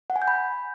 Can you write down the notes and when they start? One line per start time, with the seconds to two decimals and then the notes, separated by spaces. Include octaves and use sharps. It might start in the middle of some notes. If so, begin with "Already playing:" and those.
0.10 F#5
0.16 G#5
0.22 G6
0.28 B5